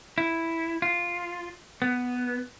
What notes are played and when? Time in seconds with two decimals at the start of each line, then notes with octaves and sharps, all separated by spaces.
0.18 E4
0.82 F4
1.82 B3